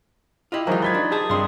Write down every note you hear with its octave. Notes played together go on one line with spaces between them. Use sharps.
E4 F4 G4 D#5 F5
D#3 E3 F#3 G#3 F4 C5 A#5
B5 D#6 G#6 A6 B6 G7
D4 F4 D#5
G4 G#4 A5
G2 G3 C4 C6 D#6